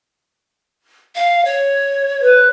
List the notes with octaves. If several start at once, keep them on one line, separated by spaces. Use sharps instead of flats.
F5
C#5
B4